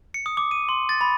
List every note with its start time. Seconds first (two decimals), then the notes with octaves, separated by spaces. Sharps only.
0.14 C#7
0.26 D#6
0.37 D6
0.51 D#7
0.69 C6
0.89 A6
1.01 B5